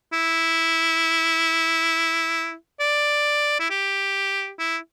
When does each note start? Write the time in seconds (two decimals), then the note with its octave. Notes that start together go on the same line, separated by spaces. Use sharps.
0.13 E4
2.80 D5
3.60 E4
3.70 G4
4.59 E4